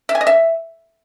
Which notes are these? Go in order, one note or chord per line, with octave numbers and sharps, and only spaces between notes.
E5
G#5
D#5
E5